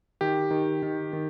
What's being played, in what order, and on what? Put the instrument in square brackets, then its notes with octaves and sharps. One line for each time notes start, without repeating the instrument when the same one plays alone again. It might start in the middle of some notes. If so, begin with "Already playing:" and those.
[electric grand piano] D#3 G4
D#3
D#3
D#3